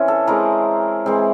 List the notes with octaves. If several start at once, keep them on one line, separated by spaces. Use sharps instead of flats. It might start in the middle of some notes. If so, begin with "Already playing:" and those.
Already playing: E3 C4 C#4
A4
E3 G#3 C4 A#4
E3 G#3 C4